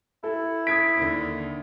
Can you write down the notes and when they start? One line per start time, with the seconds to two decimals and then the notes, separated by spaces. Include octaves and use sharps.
0.24 E4 A4
0.67 D#6 G#6 B6 D7
0.97 D#2 D3